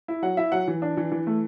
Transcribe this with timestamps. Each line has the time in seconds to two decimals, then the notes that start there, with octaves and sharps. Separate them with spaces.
0.08 E4
0.22 F#3 F#5
0.37 E4 E5
0.52 F#3 F#5
0.68 E3
0.82 D4
0.97 E3
1.12 E3
1.27 A3